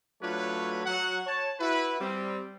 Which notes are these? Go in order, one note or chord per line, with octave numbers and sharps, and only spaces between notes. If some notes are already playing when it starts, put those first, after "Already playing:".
F#3 A3 D4 F4 B4 C#5
F#3 F#4 F#5
C#5 A5
E4 F#4 B4
G3 C4